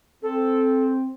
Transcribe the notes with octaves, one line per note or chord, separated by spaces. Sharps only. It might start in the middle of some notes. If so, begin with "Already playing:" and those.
C4 A4